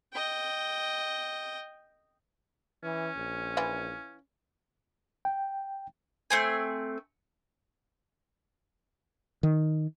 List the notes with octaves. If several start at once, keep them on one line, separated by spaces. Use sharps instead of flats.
D#5 G5
E3 C#4
A#1
E3 E4 F4
G5
A3 C4 G#5
D#3